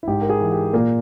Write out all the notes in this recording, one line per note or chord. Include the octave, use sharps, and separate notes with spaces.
E4
G#2 G4
A#4
G#4
E3
G4
A#2 A#3